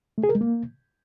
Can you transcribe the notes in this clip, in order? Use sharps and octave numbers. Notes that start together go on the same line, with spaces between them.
A3
G#4
A#4
G#3
A#3